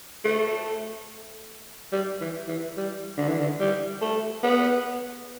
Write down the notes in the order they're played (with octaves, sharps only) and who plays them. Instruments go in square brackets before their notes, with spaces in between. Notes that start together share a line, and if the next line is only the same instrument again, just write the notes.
[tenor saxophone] A3
G3
E3
E3
G3
D3
E3
D3
G3
A3
B3